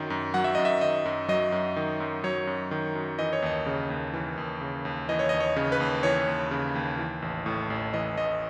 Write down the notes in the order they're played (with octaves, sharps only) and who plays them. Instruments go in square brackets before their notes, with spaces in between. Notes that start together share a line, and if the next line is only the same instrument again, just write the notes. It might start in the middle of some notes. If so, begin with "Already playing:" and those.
Already playing: [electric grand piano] F#2 D#3 F#3
F#2
F#3 F#5
E5
F#2 D#5
E5
D#3 D#5
F#2
F#3 D#5
F#2
D#3
F#2
F#3 C#5
F#2
D#3
F#2
E3 D#5
C#5
D#2 D#5
C#3
D#2
E3
D#2
C#3
D#2
E3 D#5
C#5
D#5
D#2
C#5
C#3
B4
D#2
E3 C#5
D#2
C#3
D#2
E3
A1
A2
A1
E3 D#5
A1 D#5